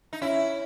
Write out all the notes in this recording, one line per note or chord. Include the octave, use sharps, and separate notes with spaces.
D#4
C#4 E4